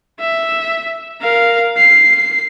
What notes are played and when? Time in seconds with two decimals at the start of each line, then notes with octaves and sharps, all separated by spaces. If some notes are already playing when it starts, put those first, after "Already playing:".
0.20 E5
1.22 A#4 F5
1.77 C7